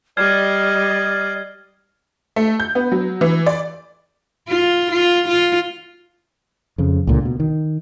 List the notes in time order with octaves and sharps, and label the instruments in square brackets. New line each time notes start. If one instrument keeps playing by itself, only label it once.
[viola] G3 D#5 [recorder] D5 [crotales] F6 G#6 C7
[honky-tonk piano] A3
G6
B3
F#3
E3
D5
[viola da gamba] F4
F4
F4
[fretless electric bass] F2 C#3
C#2 A#2 D3
B2
D#3